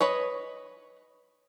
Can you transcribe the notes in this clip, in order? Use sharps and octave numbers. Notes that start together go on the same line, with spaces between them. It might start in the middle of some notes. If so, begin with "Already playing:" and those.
B4 C#5 D#5